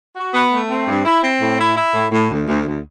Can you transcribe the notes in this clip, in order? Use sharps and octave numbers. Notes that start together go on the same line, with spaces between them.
F#4
B3
A3
C4
G2
E4
C4
A2
E4
E4
A2
A2
D2
D2
D2